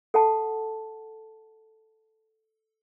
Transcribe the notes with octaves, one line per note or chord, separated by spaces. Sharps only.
A4 F#5 A5